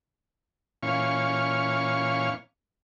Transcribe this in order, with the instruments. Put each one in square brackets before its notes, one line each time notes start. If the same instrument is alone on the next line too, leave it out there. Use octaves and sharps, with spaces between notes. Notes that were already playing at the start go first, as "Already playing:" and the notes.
[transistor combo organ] A#2 E3 C#4 F5 C#6